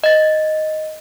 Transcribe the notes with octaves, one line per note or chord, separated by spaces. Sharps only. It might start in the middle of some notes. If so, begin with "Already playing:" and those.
D#5 A6